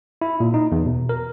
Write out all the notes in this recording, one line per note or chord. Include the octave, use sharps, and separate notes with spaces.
E4
A#2
D#4
E2
B2
A#4